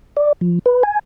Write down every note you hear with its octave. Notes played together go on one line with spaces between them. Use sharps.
D5
F3
B4
G#5